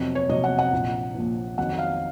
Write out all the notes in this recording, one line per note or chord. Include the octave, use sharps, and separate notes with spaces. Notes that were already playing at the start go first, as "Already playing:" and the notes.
Already playing: F2 C3 F#3
C#5
F2 C3 F#3 D#5
F#5
F#5
A#1 A#2 F3
A#1 A#2 F3
F2 D#3 F#3 F#5
F5